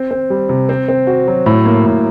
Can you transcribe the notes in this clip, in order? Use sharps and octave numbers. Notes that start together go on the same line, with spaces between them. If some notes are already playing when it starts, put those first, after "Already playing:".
Already playing: C4
C4
G3
C3
C4
C4
F#4
F#3
A2
A#3
A2